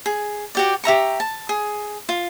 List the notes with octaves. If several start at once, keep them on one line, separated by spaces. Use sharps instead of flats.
G#4
F#4 G4 D5
G4 E5 A#5 C#6
A5
G#4
F4